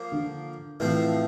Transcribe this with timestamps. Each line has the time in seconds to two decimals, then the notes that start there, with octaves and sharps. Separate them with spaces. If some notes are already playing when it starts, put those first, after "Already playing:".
Already playing: F3 A#3 C5
0.12 D3
0.80 A2 E3 F3 C4